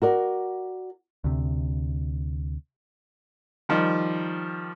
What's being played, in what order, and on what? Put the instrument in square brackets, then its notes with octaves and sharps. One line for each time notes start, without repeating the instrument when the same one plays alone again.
[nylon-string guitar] F#4 A#4 D5
[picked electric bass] D2 C3
[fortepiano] D#3 F3 G3 D#4